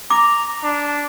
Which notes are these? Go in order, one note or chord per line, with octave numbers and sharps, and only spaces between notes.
A#5 D6
D4